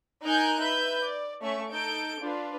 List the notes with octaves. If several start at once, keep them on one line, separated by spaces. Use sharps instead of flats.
D#4 A#4 G#5 F#6 G6
B4 E5 G6
D5
A3 C#4 E5 C#6
D#4 A4 G6 D7
D4 F4 B4